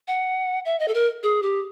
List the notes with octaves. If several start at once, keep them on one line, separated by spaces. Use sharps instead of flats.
F#5
E5
D#5
A4
A#4
G#4
G4